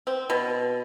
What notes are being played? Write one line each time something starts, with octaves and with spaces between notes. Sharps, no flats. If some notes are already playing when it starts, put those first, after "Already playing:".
C4
B2